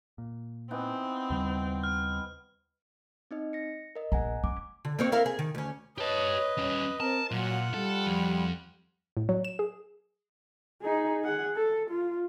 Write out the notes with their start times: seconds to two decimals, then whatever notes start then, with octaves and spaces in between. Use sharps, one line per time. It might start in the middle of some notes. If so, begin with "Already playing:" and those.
0.18 A#2
0.71 E3 B3 C4 D#4
1.30 D#2 C#3 G3
1.84 F6
3.31 C4 D#4 D#5
3.53 A#6 C#7
3.95 A#4 D#5
4.12 A#1 F#5 G#5 A#5
4.44 C#4 D6
4.85 D3
4.99 A#3 C4 C#5
5.12 E4 A#4 F5
5.26 G#4
5.39 D#3
5.55 D2 C#4
5.98 G4 B4 C#5 D#5 A5
6.57 G3 C#4
7.00 C4 A#4 A5
7.31 A#2 F#3 F4 F#5
7.74 G3 A4
8.07 F2
9.17 A2
9.29 F#3
9.44 E7
9.59 G#4
10.82 D#4 G#4
11.22 G#4 F#5
11.56 A4
11.90 F4